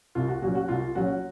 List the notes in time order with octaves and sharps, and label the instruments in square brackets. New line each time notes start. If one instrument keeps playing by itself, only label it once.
[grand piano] C2 [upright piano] F4
[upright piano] F#4
[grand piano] A#2 F#3 C#4 [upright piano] F#4
[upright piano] F#4
[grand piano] C2 [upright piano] F4
[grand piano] A#2 F#3 C#4 [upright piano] F#4